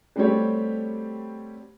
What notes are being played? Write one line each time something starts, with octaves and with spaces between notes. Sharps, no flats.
G3 A3 C4 F#4 G4 C#5